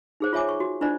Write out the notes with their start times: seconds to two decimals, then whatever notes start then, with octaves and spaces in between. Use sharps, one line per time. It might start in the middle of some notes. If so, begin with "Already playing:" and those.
0.20 D#4 G#4 C5
0.33 F4 C#5 E5 G#5 D6
0.49 C#6
0.60 F#4
0.81 D4 E4 F4 C5 D5